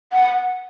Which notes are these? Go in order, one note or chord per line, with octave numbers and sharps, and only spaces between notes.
F#5